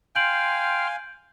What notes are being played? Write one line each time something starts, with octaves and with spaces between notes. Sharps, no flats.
F5 G5 G#5 C6 F6 G6 D7 F#7